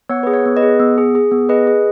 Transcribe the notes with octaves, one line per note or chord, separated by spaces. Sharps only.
B3 C#5 F#5
G#4 B4
C#5
B3
B4 D#5
G#4
B3
G#4
G#4
B3
G#4 B4 D#5
G#4